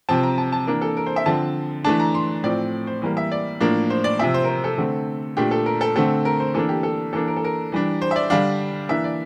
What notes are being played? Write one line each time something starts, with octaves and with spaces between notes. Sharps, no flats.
C3 F3 C4 A5
A#5
A5
A5
E3 A#3 D4 A#4
A4
A#4
C5
E5
D3 F3 C4 A5
E3 A3 D4 A5
A#5
C6
A2 F3 C4 D5
C5
E3 G3 A#3
E5
D5
A2 F3 A#3 D4
C5
D5
C3 F3 C4 E5
C5
A#4
C5
A4
D3 A3 C4
A#2 A3 D4 G4
A4
A#4
A4
D3 A3 C4 A4
A#4
C5
E3 A#3 D4 A4
G4
A4
E3 A#3 D4 A4
A#4
A4
A#4
E3 G3 D4
C5
E5
D5
D3 G3 D4 F5
E3 A#3 D4 E5
D5